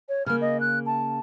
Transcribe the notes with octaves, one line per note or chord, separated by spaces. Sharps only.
C#5
C#3 A#3 F6
D#5
F#6
A5